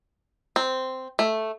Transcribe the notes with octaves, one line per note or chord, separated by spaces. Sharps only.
C4
A3